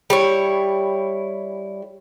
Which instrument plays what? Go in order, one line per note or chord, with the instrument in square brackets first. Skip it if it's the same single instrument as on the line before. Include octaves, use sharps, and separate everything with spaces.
[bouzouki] G3 E4 C#5